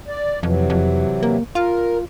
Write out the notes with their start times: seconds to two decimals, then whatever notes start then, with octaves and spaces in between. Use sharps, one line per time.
0.08 D5
0.43 F2 C3 E3 F#3
0.70 F2
1.23 A#3
1.55 F4 A#4